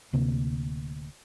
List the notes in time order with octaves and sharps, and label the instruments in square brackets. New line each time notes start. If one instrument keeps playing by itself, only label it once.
[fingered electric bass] D1 D2 C3 A#3